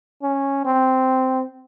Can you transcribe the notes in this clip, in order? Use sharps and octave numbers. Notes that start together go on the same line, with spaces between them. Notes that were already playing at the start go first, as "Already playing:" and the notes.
C#4
C4